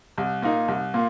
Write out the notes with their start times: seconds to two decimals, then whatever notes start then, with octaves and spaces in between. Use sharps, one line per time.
0.18 C2
0.42 A#2 A#3 D#4
0.68 C2
0.94 A#2 A#3